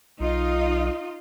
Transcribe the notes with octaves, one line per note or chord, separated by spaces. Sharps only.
B1 D#4 F4 D#5